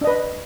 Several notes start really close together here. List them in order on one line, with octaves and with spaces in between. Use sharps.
D4 D#5 B4